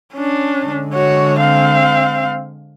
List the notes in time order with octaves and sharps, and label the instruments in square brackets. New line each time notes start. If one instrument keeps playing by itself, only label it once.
[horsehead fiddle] C#4 D4
[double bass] D3 G#3
[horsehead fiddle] F#4 C#5
C4 F5